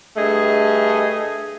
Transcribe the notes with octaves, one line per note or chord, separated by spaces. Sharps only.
G2 A3 G#4 D#5